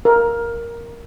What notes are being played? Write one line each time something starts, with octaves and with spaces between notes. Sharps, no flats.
A#4